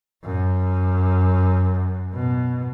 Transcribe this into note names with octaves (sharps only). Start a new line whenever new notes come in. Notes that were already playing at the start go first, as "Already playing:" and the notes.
F#2
B2